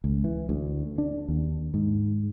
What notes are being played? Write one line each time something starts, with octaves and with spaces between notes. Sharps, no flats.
C#2
E3
D2
D4
D#2
G#2